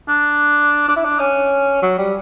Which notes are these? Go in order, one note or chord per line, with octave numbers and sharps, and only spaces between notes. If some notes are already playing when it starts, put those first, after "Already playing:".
D4
D4
E4
D4
C#4
F#3
G3